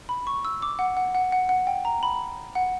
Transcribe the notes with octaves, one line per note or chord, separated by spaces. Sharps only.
B5
C#6
E6
D6
F#5
F#5
F#5
F#5
F#5
G5
A#5
B5
F#5